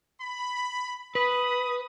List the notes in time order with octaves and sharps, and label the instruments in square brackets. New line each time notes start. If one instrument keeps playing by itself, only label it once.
[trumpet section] B5
[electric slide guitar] B4 [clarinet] B5 [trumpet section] D#6